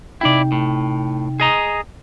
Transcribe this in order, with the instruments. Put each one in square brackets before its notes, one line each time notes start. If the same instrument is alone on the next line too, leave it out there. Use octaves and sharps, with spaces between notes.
[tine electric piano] C3 D#4 G5 [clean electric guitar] E4 D5
[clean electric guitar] A2
G#4 D#5 A#5